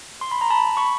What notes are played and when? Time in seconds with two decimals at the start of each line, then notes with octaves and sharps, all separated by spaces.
0.21 C6
0.31 B5
0.41 A#5
0.50 A5 B5
0.77 B5 C#6